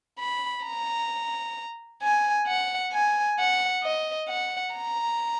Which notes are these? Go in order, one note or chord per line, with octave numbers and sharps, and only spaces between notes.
B5
A#5
G#5
F#5
G#5
F#5
D#5
F#5
A#5